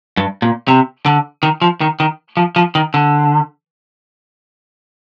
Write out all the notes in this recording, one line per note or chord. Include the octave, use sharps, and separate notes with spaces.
G2
A#2
C3
D3
D#3
F3
D#3
D#3
F3
F3
D#3
D3